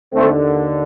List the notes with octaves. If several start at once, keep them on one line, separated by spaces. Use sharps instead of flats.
D#2 D3 A3 C4